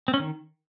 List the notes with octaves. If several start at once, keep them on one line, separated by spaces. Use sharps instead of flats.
C4
C#4
D#3